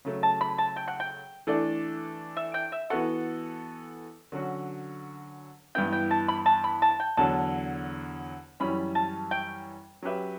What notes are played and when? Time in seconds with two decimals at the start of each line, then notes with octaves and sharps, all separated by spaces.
0.05 C#3 F#3 A3
0.23 A5
0.41 B5
0.58 A5
0.76 G5
0.88 F#5
1.00 G5
1.47 E3 A3 D4 A4 D5
2.37 E5
2.54 G5
2.72 E5
2.90 E3 B3 F#4 A4 F#5
4.32 D3 F#3 C#4 F#4
5.75 G2 E3 B3 E4 G5
5.93 G5
6.11 A5
6.28 B5
6.46 A5
6.64 B5
6.82 A5
7.00 G5
7.17 E2 D3 F#3 A5
8.60 F#2 E3 G3 C#4 B5
8.95 A5
9.31 G5
10.02 F#3 C#4 G4 B4 E5